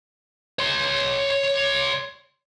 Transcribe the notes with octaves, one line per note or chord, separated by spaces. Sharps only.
C#5 C6